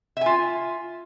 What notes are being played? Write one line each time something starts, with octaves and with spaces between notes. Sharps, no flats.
F4 E5 G#5